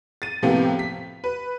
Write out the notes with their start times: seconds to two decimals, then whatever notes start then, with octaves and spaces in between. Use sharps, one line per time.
0.22 A6 D#7
0.42 A2 C3 F3 A#3 B3 G4
0.79 B6
1.24 B4